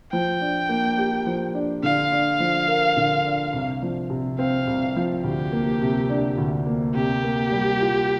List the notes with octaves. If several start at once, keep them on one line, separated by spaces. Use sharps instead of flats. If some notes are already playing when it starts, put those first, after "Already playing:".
F3 G5
D4
A#3
G4
F3
D4
D3 F5
D4
F3
A#4
D3
D4
C2
F3
C3
C4 F5
C2
F3
D2 G4
A#3
C3
D4
D2
A#3
C3 G4
A#3
G3
F4